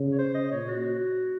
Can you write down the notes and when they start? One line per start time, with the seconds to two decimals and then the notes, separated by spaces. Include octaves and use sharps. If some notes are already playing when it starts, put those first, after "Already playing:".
Already playing: C#3
0.12 C#5
0.18 C5
0.34 D#5
0.51 A#2 C#5
0.68 F#4